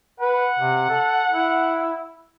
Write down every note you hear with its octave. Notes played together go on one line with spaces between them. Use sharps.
B4 F#5
C3
A4
E4